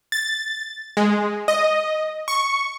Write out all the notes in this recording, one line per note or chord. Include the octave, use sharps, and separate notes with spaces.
A6
G#3
D#5
C#6